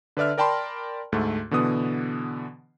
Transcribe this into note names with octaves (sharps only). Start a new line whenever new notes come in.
D3 B4 D5 E5 F6
A#4 D5 G5 A5 B5 C6
D2 G#2 A3
B2 D3 E3 B3 D#6